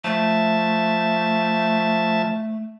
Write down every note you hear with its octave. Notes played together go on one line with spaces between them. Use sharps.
F3 A3 E5 A5